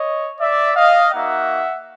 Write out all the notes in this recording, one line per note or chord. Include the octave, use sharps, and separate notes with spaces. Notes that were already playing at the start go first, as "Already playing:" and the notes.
Already playing: C#5 D#5
D5 E5
D#5 F5
A#3 D#4 F#4 E5 F#5